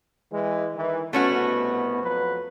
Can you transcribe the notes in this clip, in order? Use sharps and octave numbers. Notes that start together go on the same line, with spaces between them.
E3 G#3
D#3 E3
C2 B2 A3 B3 C#4 F#4
F2 F#3 B4